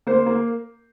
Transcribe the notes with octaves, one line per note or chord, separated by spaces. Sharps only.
A#3 C5
A#3